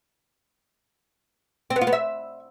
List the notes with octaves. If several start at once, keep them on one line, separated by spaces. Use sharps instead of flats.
C4
B3
F4
B3
E5